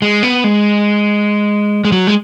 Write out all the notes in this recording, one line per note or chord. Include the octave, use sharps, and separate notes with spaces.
G#3
B3
G#3
G#3
F#3
G#3